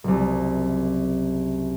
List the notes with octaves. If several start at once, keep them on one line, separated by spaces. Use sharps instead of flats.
F#1 C2